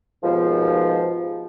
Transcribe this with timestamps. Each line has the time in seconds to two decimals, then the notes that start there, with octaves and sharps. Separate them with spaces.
0.24 D#2 G#2 B2 F3